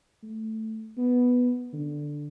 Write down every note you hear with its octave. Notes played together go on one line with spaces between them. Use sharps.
A3
B3
D3